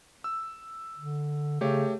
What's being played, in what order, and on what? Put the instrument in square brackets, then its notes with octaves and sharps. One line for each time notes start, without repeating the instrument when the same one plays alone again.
[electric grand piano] E6
[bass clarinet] D3
[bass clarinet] C#3 [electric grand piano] A3 G4 C#5